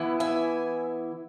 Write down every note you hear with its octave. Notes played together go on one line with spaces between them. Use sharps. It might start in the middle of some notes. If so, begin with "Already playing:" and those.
Already playing: E3 B3 E4
E5 G#5